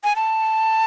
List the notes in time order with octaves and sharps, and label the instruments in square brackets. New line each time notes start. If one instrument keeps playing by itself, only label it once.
[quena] G#5
A5